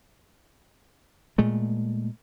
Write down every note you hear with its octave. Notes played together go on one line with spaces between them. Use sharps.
A#2 G#3 A3